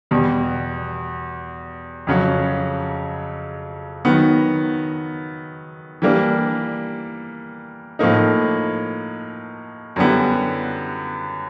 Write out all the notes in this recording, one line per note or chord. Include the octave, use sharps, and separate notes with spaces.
E2 B2 G3
F2 C#3 F#3
D#3 F#3 B3
E3 G3 A#3 D4
A2 F3 A#3 D#4
F#2 D3 G3 B3 E4